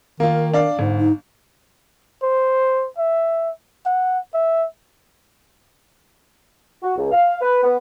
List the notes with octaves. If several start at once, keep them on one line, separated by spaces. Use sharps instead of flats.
D#3 A#3 F4 A#4
D4 D5 F5
G1 G#2
D#4
C5
E5
F#5
E5
F#4
C#2
F5
B4
B3